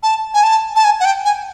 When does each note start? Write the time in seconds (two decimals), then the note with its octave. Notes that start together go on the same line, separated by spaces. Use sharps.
0.03 A5
0.34 G#5
0.43 A5
0.76 A5
0.84 G#5
1.00 F#5
1.05 G5
1.25 G#5